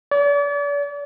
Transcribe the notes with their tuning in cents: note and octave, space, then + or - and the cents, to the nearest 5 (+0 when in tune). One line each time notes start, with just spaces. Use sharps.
D5 -40